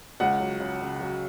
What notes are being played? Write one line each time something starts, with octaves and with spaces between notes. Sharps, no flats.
C#2 F#5
F#3
C#3
C#3
F#3